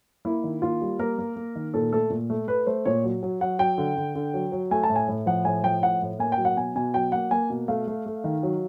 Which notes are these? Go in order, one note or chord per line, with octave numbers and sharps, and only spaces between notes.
A#3 E4
D#3
A#3 F4
G3
A#3 A#4
A#3
A#3
D#3
A#2 A4
A3 A4
A#2
A3
A3 B4
A3 C5
A#2 C#5
F#3
F#3
F#3 F#5
F#3 G5
D3
D3
D3
F#3
F#3
A3 G#5
A5
A2
G#5
A2
F3 F#5
A2 G#5
F3 G5
A2 F#5
A2
A#3 G#5
G5
F#3
F#5
B2 G#5
B2 G#5
F#3 G5
A#3 F#5
A#3 G#5
B2
A3 F5
A3
A3
D#3
F#3